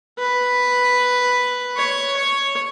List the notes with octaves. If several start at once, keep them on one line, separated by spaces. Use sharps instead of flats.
B4
C#5
C#5